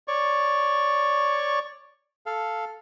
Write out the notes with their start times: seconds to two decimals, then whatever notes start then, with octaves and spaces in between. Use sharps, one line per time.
0.08 C#5 D5 C#6
2.26 A4 F5